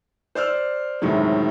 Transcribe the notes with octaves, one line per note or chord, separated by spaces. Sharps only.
C5 D5 E6 F6
D2 A2 C3 D#3 F#3 G#3